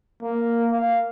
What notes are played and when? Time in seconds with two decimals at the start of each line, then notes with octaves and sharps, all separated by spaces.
0.22 A#3
0.72 F5